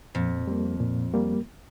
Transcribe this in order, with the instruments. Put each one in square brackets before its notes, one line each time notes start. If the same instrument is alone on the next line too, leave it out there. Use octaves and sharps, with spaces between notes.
[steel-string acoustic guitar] F2 [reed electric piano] A#2
[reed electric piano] G3 A#3
A#2
G3 A#3